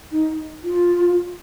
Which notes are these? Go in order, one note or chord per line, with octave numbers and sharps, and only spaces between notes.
D#4
F4